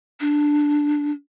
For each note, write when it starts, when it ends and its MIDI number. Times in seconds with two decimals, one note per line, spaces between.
0.20 1.11 62